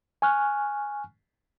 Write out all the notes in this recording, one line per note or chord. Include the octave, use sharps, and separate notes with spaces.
G#5 C#6 F6 F#6